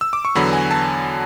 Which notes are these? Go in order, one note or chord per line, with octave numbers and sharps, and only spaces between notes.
E6
D6
C#6
E2 D3 F#3 B3 B5
G#5
A5